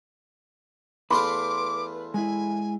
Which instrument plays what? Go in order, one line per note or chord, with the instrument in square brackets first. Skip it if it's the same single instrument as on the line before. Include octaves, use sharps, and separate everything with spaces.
[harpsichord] E2 A3 F5 [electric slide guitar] B4 [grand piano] B5 C6 [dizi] D6
[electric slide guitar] G#3 E4 [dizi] G#5